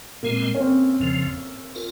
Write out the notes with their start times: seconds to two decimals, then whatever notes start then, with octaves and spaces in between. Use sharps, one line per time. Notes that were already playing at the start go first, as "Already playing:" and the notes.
0.23 A#2 G#3 A#3 C4
0.55 C#4
0.60 C4
1.00 F2 C#3 F3
1.75 F4 A#4